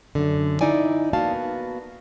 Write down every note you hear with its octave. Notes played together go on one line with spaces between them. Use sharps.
F#2 D3
D#4 E4 D5 G#5
A#3 B3 F#4 F5 A5